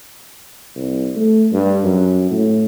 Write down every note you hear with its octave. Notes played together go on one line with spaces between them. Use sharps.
C2
A3
G2
F#2
A2